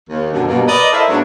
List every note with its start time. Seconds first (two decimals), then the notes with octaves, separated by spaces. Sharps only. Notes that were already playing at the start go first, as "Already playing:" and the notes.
0.10 D#2
0.33 F#2 B2 D3
0.48 G2 B2 A#3
0.68 A#4 B4 D5 D#5
0.92 E4 A4 A#4 C5 E5 F5
1.10 G#2 F#3 B3 D4